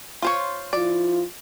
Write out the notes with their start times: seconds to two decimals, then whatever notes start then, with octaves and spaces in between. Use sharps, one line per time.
0.22 F4 C5 C#5
0.73 F3 E4 F4 D5